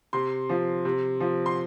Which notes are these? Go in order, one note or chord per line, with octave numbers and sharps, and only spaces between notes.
C3 C6
F3
C3
F3
C6